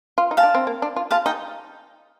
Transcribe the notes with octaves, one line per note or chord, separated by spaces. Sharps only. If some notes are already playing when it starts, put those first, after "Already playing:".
F4
D#4
F5 A5
D4
C4
A#3
D4
F4
F4 F5 A5
D#4 D#5 G5